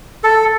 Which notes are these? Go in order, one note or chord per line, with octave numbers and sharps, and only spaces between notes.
A4